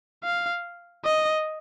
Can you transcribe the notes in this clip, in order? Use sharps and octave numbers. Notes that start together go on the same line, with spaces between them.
F5
D#5